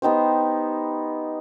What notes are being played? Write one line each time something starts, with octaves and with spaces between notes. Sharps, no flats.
B3 D#4 G4 C5